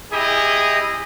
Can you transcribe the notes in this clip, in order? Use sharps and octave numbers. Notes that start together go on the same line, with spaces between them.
E4 G4 G#4 D#5